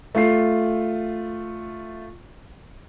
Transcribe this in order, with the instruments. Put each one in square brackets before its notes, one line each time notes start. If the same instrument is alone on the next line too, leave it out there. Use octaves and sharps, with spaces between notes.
[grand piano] A3 F4 C7